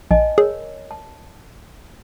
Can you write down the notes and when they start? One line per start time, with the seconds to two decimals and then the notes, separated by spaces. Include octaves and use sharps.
0.11 A#1 D#5 G#5 A5
0.38 G#4 A#4 C#5
0.91 A5